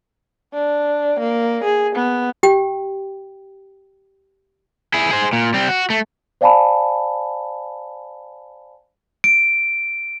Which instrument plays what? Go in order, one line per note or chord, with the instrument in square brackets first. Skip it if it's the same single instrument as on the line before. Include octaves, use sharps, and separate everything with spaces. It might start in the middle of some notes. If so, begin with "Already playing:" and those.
[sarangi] D4
A#3
G#4
B3
[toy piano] G4 G5
[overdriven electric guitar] E4 G#4
G#4 C5
A#2
G3 C4
F#4
A3
[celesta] C5 D5 F5 G#5 A5 B5
[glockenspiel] D7